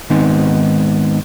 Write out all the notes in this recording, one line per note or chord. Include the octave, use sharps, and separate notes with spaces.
G#2 D#3 G#3 B3 C4 D#4